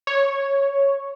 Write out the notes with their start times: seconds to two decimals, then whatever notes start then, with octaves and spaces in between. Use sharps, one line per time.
0.07 C#5